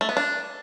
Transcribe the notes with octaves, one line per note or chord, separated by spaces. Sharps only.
A3
B3
D4